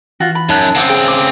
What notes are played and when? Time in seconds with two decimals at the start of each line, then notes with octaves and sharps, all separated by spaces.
0.20 E3 F4 F#4
0.35 B5
0.49 F#2 D#4 A5 F#6
0.75 C#3 C4 F#5 D6
0.90 G#4 G5
1.08 D6